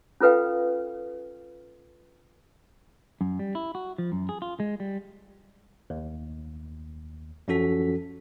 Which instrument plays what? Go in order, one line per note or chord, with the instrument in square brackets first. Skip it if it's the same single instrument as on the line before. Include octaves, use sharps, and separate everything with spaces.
[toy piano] C#4 F4 A4 B4 F5 G5
[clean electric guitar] F#2
G3
E4
F#4
F3
F#2
G#4
F4
G#3
G3
[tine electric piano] D#2
F#2 F3 C#4 F#4 A4 B6